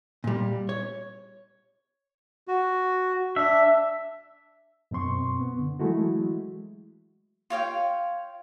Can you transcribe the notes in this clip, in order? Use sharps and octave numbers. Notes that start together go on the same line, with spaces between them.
A#2 G3
C#5
F#4
D4 E5
F#2 B2 C4 C6 C#6
B3
D3
E3 F#3 G#3 A3 E4 F#4
F4 C#5 F5 G5